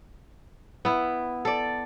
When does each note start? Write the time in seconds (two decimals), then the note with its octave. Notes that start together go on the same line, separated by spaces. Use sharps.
0.85 B3 E4
1.45 A4 D5